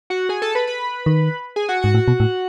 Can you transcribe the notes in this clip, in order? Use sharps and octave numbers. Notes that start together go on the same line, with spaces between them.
F#4 F#5
G#4 G#5
A4 A5
B4 B5
B4 B5
D#3
G#4 G#5
F#4 F#5
G#2 F#4 F#5
A2
B2
A2